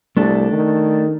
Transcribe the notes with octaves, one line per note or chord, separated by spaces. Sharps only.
C2 A3 D4 A4
D#3